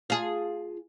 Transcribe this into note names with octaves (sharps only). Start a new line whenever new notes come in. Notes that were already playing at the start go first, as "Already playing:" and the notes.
F4 G#4